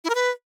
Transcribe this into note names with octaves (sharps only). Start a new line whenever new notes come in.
E4
A#4
B4